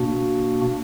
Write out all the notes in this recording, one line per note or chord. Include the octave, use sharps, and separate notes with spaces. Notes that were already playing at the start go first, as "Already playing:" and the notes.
Already playing: B2 A#3 D4 F#4